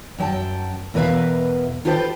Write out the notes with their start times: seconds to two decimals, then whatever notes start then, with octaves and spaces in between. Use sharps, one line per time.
0.18 F#2 F#3 G5 A5
0.94 E2 B2 A#4 B4 E5 F5
1.85 F4 G4 A4 B4 C5 G5